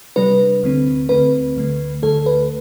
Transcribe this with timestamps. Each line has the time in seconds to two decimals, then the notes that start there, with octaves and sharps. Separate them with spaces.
0.16 C3 G3 D4 B4
0.63 D2 D3 A3 C4
1.09 D2 D3 A3 C4 B4
1.56 D2 D3 A3
2.02 D2 D3 A3 A4
2.26 B4